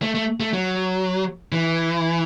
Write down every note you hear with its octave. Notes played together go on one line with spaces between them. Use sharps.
A3
A3
A3
F#3
E3